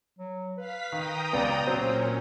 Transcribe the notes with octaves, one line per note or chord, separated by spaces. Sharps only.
F#3
B4 F5 B6
D#3 G5 A#5 D#6
C#2 B2 B3 D5
A#2 F#3 C4 C#4 C5